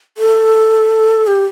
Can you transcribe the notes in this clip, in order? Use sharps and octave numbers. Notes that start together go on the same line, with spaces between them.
A4
G4